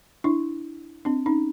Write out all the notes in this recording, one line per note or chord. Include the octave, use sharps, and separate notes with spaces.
D4 E4
C4 D4
C#4 D#4